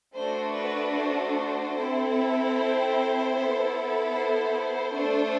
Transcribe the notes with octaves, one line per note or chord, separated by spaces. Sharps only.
A3 D4 F#4 C5
B4
C5
C4 E4 A4
C5
B3 E4 A4
C5
A3 D4 A4